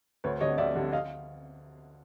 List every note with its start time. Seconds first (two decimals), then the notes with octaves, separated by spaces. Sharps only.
0.24 D2 B4 C#5
0.41 D3 G3 C#5 D#5
0.58 D2 D5 E5
0.75 D3 G3
0.92 D#5 F5